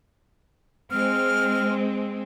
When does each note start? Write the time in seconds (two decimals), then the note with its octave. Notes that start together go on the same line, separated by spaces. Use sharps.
0.91 G#3 C4 F6